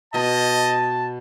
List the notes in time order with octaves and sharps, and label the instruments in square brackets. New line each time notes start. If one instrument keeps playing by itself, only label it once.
[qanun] B2 [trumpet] D#5 [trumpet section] A5